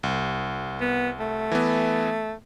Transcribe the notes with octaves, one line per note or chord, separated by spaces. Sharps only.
C2
B3
A3
E3 B3